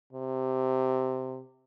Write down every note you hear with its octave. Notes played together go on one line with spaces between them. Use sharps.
C3